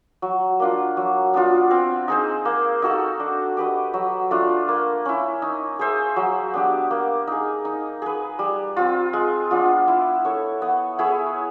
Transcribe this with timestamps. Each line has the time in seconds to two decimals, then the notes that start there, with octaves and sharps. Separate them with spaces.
0.22 F#3
0.60 A#3 D4 F4
0.97 F#3
1.34 B3 D4 F4
1.71 C4
2.08 D#4 G#4 C5
2.45 A#3
2.82 D#4 F#4 A4
3.20 D4
3.57 G4 B4 D#5
3.94 F#3
4.31 A3 D4 F4
4.68 A#3
5.05 C#4 E4
5.42 D#4
5.79 G#4 C5 E5
6.16 F#3
6.54 B3 D4 G4
6.91 A#3
7.27 D#4 G#4
7.65 D#4
8.02 G#4 B4
8.39 G3
8.76 C4 F4
9.13 G#3
9.51 B3 D4 F4
9.88 E4
10.25 A4 C#5
10.62 B3
10.99 E4 G#4 C#5